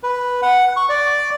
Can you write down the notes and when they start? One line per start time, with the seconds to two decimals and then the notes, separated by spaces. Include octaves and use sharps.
0.03 B4
0.42 F#5
0.77 C#6
0.89 D5